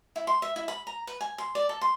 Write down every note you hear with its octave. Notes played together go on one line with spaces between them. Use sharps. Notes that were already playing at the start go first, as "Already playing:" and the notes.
E4
C6
E5
E4
B5
A#5
B4
G#5
C6
D5
A4
C6